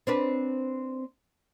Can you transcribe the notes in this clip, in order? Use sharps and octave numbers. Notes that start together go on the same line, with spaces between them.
C4 D4 B4